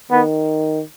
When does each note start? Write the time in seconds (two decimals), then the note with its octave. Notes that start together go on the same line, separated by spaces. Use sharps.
0.11 D#3 B3